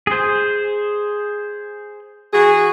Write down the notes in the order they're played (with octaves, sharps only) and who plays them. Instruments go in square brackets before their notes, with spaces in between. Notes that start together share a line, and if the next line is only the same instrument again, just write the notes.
[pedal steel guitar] G#4 C5
[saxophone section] E3 F#4 G#4